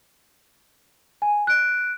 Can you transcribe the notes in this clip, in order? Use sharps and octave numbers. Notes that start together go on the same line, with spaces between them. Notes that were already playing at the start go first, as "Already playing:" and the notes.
G#5
F#6 D7